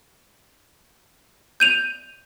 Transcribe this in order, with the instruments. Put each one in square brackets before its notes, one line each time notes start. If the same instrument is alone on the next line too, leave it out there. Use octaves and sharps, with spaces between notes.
[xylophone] G6 D#7 F7